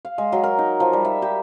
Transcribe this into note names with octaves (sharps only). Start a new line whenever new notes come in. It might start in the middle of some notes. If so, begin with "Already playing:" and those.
F5
G#3
F#3
A#4
D#4
F3
G3
E5
G4